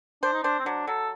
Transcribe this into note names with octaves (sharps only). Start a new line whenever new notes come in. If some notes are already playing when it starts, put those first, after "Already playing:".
D4 C5
D#4
D4 C5
C4
F#3 D4
F#3 A4